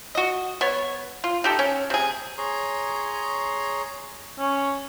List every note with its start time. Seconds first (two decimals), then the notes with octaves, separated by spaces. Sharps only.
0.15 F#4 D#5
0.61 B3 C#5
1.24 F4
1.44 D#4 G4 A4
1.59 C#4
1.90 C3 G#4
2.38 G#4 C#5 A#5 C6
4.39 C#4